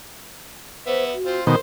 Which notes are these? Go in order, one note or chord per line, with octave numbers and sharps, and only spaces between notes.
B3 C5 E5
F#4
C4 F4
B2 D#3 A#4 C5